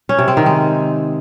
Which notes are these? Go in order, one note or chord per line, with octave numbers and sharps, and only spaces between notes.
C#4
C3
C4
D#3
G#3